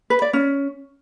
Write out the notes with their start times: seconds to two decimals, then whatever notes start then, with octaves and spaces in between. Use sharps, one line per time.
0.10 B4
0.22 D5
0.33 C#4